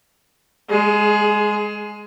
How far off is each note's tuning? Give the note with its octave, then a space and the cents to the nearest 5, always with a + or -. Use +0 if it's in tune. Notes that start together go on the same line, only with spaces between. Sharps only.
G#3 -5 G#4 +20